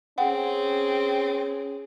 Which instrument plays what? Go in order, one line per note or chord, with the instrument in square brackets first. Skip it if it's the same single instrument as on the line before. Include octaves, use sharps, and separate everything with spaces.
[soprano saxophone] C4 [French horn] C#4 [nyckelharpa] G#4 [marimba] F#5 G5